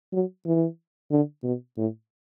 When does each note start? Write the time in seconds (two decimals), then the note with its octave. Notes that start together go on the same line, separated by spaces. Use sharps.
0.13 F#3
0.46 E3
1.11 D3
1.43 B2
1.77 A2